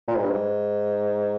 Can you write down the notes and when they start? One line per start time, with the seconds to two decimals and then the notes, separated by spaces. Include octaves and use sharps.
0.08 A#2
0.15 G#2
0.23 G2
0.30 G#2